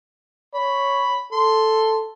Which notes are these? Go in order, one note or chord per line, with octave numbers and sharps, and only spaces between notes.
C#5 B5
A4 C6